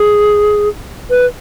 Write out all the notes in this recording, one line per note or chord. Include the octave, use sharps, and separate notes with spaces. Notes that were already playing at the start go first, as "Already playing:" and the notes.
Already playing: G#4
B4